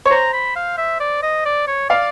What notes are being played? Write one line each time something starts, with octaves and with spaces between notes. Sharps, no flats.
C#5
C5 A#5
B5
F5
E5
D5
D#5
D5
C#5
D5 F5